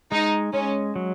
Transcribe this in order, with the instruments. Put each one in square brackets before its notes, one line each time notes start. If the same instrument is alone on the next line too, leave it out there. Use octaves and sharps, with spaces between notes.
[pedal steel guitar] G#3 [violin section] D#4
[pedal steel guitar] G#3 [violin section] C#4
[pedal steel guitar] F#3